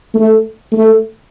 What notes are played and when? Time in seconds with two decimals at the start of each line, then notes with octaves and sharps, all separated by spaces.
0.14 A3
0.72 A3